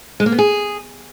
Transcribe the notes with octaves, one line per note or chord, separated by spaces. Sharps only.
G#3
A#3
B3
G#4